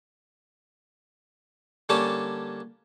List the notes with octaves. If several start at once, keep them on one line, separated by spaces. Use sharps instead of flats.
D3 G3 A#3 C#4 D5 A5